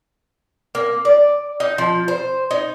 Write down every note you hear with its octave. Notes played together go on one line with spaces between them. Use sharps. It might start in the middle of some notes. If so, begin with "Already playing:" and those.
A#3
D5
D#4
F3
C5
D#4